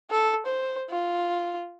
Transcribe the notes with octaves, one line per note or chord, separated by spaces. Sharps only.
A4
C5
F4